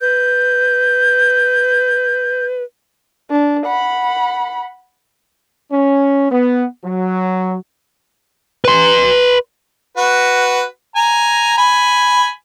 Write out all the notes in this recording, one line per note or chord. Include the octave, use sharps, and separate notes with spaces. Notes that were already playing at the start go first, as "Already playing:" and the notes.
B4 G6
D4
F#5 B5
C#4
B3
F#3
B4 C6
F#4 B4
G#5 A#5
G#5 B5